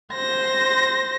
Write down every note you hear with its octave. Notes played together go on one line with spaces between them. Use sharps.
C5 A#6